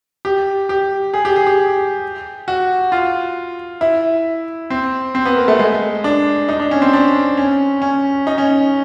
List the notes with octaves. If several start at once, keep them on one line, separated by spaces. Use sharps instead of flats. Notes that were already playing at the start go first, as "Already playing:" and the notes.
G4
G4
G#4
G4
G#4
G4
F#4
F4
E4
C4
C4
B3
A#3
A3
G#3
D4
D#4
D4
C#4
C4
D4
C#4
C#4
D#4
C#4